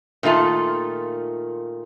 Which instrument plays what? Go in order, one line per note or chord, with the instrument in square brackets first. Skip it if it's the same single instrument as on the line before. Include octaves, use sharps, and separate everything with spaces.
[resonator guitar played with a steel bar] A#2 D#3 A3 F4 A5